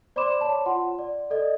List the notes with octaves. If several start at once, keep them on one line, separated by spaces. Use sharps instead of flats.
C5 D5 B5 C6 D6 E7
C#5 A5
F4 F#5 C6
D5
A4 D5 D#5